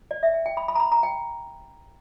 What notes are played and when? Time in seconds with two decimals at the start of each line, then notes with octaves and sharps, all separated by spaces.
0.11 D5
0.23 E5
0.34 G5
0.46 G5
0.57 B5
0.68 B5
0.75 A#5
0.80 B5
0.92 A#5
1.03 G5